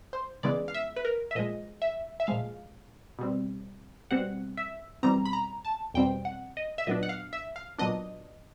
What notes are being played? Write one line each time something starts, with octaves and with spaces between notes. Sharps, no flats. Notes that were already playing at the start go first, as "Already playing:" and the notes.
C5
C#3 E3 G#3 B3 D5
F5
E5
B4
A#4
E5
A#2 F3 G#3 D#5
E5
E5
A#2 F3 G#3 F5
B2 G3 C4
B2 G3 C4 F#5
E5
E2 B2 G3 C4 A#5
B5
A#5
A5
E2 B2 G3 C4 G5
F#5
D#5
E5
A#2 F#3 B3 D4 D#5
F#5
F5
E5
F5
A#2 F#3 B3 D4 D#5